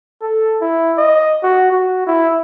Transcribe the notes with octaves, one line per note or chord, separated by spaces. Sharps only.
A4
E4
D#5
F#4
F#4
E4